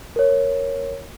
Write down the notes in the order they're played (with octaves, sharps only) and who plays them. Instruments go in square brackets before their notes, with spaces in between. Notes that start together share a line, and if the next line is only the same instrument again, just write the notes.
[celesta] A#4 C#5